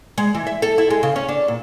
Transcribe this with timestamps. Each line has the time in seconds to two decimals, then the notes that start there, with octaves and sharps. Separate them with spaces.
0.18 G#3
0.35 E3
0.47 E5
0.62 A4
0.78 E4
0.90 G#3
1.03 C#3
1.16 C#4
1.29 D4
1.48 A#2